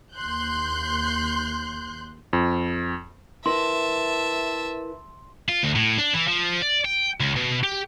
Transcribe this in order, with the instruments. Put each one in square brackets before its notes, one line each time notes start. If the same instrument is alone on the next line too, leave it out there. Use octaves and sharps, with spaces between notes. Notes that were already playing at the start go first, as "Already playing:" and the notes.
[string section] D#2 C6 F#6 G6
[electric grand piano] F2
[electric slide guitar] E4 A#4 B4 [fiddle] E5 A5 [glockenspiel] C6
[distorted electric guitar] F4
D2
A2
D4
E3
F3
D5
G5
C#2
B2
G4